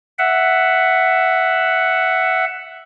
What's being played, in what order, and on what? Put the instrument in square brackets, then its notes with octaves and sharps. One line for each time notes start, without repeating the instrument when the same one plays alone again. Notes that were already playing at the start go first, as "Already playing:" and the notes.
[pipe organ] E5 F#5